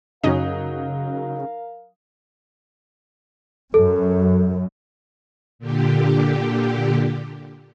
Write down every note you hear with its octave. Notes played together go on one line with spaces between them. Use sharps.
F#2 C#3 F#3 C#4 D#4 A#4 D#5 F5
F#2 A4
A#2 D3 G4